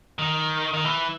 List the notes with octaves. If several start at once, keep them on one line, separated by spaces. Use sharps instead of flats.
D#3
D#3
E3